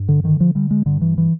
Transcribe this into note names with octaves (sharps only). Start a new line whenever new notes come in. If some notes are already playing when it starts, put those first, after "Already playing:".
Already playing: G2
D3
D3 D#3
F3
D3 G3
G#3
G2 D3
E3
E3